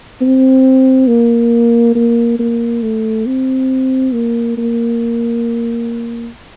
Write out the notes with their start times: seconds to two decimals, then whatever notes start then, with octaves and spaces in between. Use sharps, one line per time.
0.21 C4
1.08 A#3
1.95 A#3
2.39 A#3
2.82 A3
3.26 C4
4.13 A#3
4.58 A#3